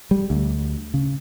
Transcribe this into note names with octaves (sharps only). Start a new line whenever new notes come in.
G3
D2
C#3